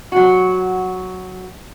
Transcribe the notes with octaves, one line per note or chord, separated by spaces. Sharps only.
F#3 F#4